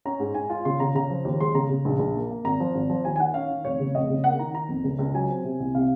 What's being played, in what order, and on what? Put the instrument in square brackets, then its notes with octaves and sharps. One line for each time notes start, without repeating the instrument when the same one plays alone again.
[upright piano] C#4 A#5
G#2
G#2 G#5
F4
C#3 C6
C#3 A#5
C#3 A#5
F3
D#2
G#3 C6
C#3 A#5
C#3
A#1
A#1
A#3
A#3
G#1 A#5
F3
G#1
F3
D#2 G#5
G#5
D#3 F#5
C#4 F5
D#3
F1 C#5
C#3
F1 D#5
C#3
A#3 F#5
D#3 A#5
D#3 A#5
F2
C#2
C#2
F#3 G#5
C4
C3
C2
C3 F5